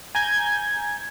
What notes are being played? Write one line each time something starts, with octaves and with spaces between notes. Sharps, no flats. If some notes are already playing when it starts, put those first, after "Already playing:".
G#5 A#5 G6 G#6